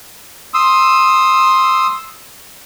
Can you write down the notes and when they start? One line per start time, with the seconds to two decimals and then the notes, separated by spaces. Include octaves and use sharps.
0.54 C6 D#6 E6